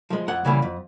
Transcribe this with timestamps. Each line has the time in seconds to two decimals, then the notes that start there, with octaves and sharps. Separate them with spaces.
0.10 F3 G#3
0.28 F2 F#5
0.45 C#3 E3 G3 A#3
0.62 F2